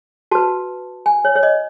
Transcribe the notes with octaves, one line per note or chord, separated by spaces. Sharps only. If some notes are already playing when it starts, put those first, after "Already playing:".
F#4 B4 A5
G#5
C#5
C#5
D#5